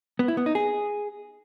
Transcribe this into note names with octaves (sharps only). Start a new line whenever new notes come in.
B3
E4
B3
D#4
G#4